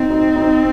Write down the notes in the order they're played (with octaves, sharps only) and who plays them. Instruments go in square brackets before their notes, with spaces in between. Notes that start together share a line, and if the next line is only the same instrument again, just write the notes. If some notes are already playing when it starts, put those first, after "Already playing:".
Already playing: [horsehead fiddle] C4 [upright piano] D#4
[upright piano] D#4
D#4